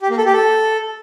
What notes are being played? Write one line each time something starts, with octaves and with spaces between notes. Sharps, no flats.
G4
A#3
A4
G4
A4